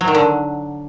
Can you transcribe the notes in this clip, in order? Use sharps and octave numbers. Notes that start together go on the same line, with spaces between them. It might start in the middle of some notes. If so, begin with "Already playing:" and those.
F#3
D#3
D3